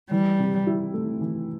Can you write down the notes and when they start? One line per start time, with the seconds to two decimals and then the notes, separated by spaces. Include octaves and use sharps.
0.11 E3 G3
0.39 C3
0.67 E4
0.94 A3
1.21 E3